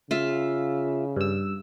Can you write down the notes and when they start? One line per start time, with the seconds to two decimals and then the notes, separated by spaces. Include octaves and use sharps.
0.11 C#3 F4 E5
1.16 G2 E6